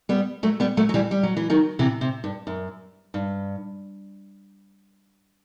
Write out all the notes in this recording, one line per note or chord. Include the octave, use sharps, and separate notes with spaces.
G3 B3
F#3 A3
G3 B3
F#3 A3
F#3
E3 G3
G3
F#3
E3
D#3 F#3
C3 E3
C3
G2
F#2
G2